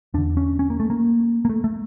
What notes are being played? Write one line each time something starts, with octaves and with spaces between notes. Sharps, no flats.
E2 D3 D4
C#4
C#4
A#3
A3
A#3
A#3
A3
A3